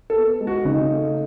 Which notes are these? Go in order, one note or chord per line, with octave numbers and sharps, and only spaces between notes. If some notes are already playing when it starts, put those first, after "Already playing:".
A4
B3
G#3
F#4
C#3 D#4
A3